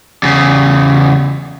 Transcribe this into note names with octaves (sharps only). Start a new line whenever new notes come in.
E2 C#3